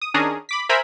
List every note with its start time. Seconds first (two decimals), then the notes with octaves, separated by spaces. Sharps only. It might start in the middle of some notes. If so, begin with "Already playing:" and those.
0.02 D#6
0.14 D#3 C#4 D4 G#4 A#5 D#6
0.49 B5 D6 B6
0.69 A#4 C5 E5 G#5 A#5 B5